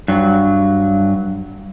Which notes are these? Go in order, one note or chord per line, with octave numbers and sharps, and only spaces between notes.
G2 F#3